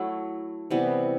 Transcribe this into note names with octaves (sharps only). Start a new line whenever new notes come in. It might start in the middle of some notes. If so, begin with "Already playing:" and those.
Already playing: F#3 A3 E4
C3 E3 G3 B3